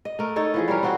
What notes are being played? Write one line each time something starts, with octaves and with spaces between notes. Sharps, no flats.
D#5
A3 A#4
D#4 A4 C#5 D#5
E3 F3 G#4
G3 C#4 A#4
C4 F4 F#4 C5